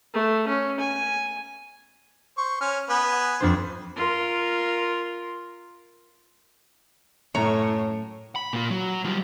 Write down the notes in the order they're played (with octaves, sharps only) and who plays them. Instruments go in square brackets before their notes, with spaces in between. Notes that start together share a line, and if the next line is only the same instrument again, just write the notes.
[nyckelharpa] A3
C#4
G#5
[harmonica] C5 C#6
C#4 F6
B3 B4 G#5
[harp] F2 D4 C5
[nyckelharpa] F4 A#4
[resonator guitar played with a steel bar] F#2 C#5 A#5 [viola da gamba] A2
[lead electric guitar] B5
A#2 F4
F#3
G3 F4